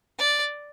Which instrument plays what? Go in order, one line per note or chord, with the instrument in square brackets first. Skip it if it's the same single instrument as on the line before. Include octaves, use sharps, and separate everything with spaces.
[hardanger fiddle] D5